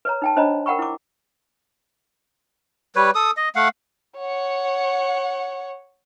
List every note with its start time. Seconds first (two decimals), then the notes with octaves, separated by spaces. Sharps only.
0.05 B4 C#5 A#5
0.22 D#4 G5 A5
0.36 D4 C5 C#5 D#5 A#5 B5
0.66 A#4 F#5 G5 B5 C#6
0.79 E4 D6
2.96 G3 B4 C#5
3.15 A4 D#6
3.37 D#5
3.55 A3 F5 F#5
4.18 C#5 F#5